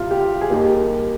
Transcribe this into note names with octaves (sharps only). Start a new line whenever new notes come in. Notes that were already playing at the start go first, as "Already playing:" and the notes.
Already playing: C2 C3 G3 F4
G4
F4
G#4
D#2 D#3 G3 A#3 G4